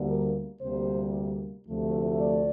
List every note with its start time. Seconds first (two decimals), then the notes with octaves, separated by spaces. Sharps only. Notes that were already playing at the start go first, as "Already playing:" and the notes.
Already playing: D2 D3 G3 A#3
0.08 A#4
0.61 D2 C3 G3 A#3 C5
1.67 D2 C3 F3 A3
2.20 D5